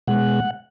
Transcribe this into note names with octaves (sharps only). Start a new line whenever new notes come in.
B2 G#3 F#5